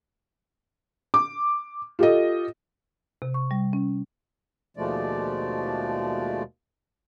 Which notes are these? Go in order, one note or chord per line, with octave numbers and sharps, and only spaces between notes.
D6
F4 G4 A4 D#5
C3
C#6
G3
C#4
D#2 B2 F3 G#3 A3 D5